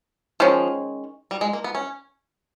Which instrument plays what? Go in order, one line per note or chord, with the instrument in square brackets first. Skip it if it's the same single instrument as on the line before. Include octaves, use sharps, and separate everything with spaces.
[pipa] D#3 G#3 C#4 [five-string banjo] F3
[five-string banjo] G3
G#3
A#3
B3
C#4